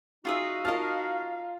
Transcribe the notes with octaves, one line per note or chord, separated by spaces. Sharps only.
D#4 F4 F#4 G#4 E5 F5
F4 A#4 D#5 A5 F6